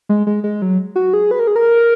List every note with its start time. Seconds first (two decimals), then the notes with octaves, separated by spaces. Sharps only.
0.09 G#3
0.27 G#3
0.44 G#3
0.62 F#3
0.96 F#4
1.14 G#4
1.31 B4
1.39 A#4
1.47 G#4
1.56 A#4